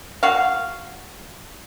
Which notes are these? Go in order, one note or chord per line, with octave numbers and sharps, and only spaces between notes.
F#4 F5